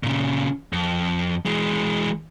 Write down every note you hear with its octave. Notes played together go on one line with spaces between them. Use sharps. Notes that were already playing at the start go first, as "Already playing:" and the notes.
A#2 C#3
F2
E3 G#3